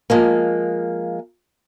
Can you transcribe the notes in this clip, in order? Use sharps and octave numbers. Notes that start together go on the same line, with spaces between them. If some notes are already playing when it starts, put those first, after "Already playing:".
F3 G#3 A#3